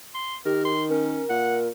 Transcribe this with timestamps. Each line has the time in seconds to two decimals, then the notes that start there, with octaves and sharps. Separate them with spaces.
0.15 C6
0.46 D#3 G4 A#4
0.65 C6
0.90 C#4 A#4
1.30 A#2 F#5